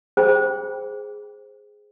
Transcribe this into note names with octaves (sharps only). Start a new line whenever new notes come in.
G#4 C5 G5